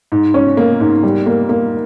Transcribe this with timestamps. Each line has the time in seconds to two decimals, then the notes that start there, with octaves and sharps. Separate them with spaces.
0.12 G#2
0.34 C#4
0.57 A#3
0.80 G#2
1.03 G3
1.26 A#3
1.49 A#3